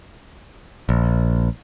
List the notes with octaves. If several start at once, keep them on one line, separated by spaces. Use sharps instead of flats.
A#1